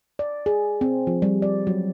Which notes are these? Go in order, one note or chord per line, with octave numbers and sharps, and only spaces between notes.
D5
G#4
C4
F3
G3
D5
F#3